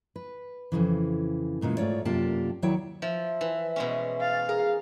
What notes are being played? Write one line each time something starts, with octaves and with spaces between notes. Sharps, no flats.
B4
F2 G#2 C#3 E3
E2 A#2 C#3 G#3
G#2 A3 F4 C#5 D5
F#2 C3 A#3 F4 G4 A5
D#2 F#3 E4 C#5 D5 G5
F3 E5
E3
B2 G#3 C#4
F5 A6
G#4 A#4